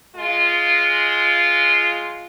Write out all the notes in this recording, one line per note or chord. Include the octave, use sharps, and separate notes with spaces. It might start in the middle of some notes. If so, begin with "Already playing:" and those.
G#3 F4